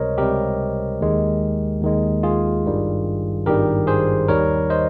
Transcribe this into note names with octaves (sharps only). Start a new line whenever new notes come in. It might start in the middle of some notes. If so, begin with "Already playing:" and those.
Already playing: C#2 C3 G3 A#4 C5 C#5 D#5
C#2 C3 G3 G4 A#4
D#2 D#3 G#3
D#2 D#3 G#3
F4 G#4
G#1 G2 D#3 G3
G#1 G2 D#3 G3 G4 A#4
G#4 C5
D#2 D#3 G3 A#4 C#5
C5 D#5